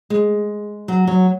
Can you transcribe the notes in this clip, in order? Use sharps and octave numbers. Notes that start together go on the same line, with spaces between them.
G#3
F#3
F#3